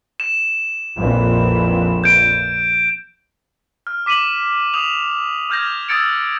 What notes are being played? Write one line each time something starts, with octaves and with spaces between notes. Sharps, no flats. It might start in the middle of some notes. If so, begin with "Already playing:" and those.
E7
A#1 F2 E3
G6 D7
F6
D6 B6 D#7 E7 F#7
D#6 F7
D#6 F6 G6 G#6 A#6
D#6 E6 G#6 A6 C#7 D7